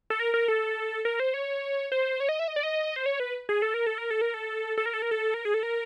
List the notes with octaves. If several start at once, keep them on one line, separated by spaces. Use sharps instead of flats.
A4
A#4
A#4
A4
A#4
C5
C#5
C5
C#5
D#5
E5
D#5
D5
D#5
C5
C#5
B4
G#4
A4
A#4
A4
A#4
A4
A#4
A4
A4
A#4
A4
A#4
A4
A#4
G#4
A4
A#4